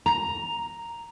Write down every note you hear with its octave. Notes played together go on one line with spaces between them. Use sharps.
A#5